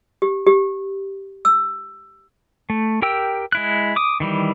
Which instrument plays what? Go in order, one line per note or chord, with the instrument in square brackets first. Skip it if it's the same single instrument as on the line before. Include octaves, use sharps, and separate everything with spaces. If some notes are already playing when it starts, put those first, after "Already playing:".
[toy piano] G4
G4
E6
[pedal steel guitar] A3
G4 A#4 G5 E6
G#3 E4 F#6
D6 D#6
D#3 E3 G3